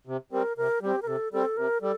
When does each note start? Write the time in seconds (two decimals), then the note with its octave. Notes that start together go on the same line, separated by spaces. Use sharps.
0.07 C3
0.32 G3 C4 A#4
0.57 C3 A#4
0.82 G3 C4 G4
1.02 A#4
1.06 C3 A4
1.32 G3 C4 A4
1.57 C3 A#4
1.81 G3 A4